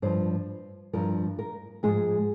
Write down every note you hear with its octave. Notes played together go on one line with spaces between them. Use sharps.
G2 F3 C5
G2 F3 A#4
A#4
G#2 F3 G#4